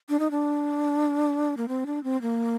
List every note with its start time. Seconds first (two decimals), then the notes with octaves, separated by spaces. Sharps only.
0.09 D4
0.19 D#4
0.31 D4
1.57 A#3
1.68 C4
1.86 D4
2.04 C4
2.22 A#3